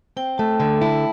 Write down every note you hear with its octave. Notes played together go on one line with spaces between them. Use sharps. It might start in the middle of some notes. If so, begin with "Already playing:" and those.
C4 G5
A3 A5
D3
E4 A5